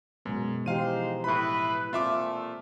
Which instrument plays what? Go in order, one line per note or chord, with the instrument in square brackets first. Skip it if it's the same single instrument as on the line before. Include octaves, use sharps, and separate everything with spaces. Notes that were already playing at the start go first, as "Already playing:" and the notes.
[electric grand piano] F#2 [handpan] B2 G#3 B3
[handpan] E3 F3 G4 [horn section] G#3 D#4 C5 [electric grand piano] F5 D#7
[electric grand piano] A2 B5 [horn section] E4 B4
[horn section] A#2 F3 A3 [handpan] C4 [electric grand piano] F4 E5 D6